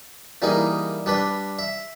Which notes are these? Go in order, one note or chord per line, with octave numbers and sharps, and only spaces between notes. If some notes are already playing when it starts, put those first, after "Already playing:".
E3 G3 A#3 D#4 G#4
G3 D4 B4
E5